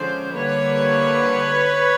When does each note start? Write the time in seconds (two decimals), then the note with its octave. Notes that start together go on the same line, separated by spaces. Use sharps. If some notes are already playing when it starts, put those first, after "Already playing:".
Already playing: D3 F3 G#3 C#4 C5 D5
0.32 D3 G3 A#3 B4 C#5